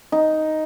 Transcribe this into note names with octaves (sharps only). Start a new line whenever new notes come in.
D#4